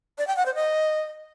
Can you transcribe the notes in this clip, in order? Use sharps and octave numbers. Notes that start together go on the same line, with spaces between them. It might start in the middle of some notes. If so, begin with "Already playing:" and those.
D5
G5
F#5
C5
D#5